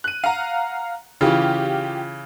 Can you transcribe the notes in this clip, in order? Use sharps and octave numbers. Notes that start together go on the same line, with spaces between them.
F#6 D#7
F5 F#5 A#5
C#3 E3 F4 G4